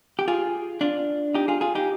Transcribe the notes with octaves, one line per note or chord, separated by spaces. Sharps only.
G4
F4 G#4
D4 F4
D#4 G4
F4 G#4
F4 G#4
D#4 G4